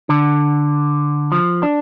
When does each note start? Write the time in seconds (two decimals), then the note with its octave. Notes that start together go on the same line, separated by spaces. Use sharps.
0.09 D3
1.32 F3
1.63 D4